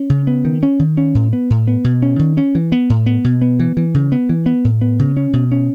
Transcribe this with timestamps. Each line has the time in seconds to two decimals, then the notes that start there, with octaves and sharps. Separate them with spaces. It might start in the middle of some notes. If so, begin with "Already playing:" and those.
Already playing: C#4
0.10 C#3
0.27 B3
0.45 D#3
0.63 C#4
0.79 D#3
0.97 C#4
1.15 A2
1.33 B3
1.50 A2
1.68 B3
1.84 B2
2.02 C#4
2.19 D#3
2.37 C#4
2.55 E3
2.72 B3
2.90 A2
3.06 B3
3.24 B2
3.42 B3
3.60 E3
3.77 E3
3.94 C#3
4.12 B3
4.29 E3
4.46 B3
4.65 A2
4.81 B3
4.99 C#3
5.17 C#4
5.33 B2
5.52 C#4